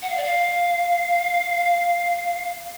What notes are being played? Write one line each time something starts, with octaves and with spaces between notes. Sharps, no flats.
F#5
F5
D5
F5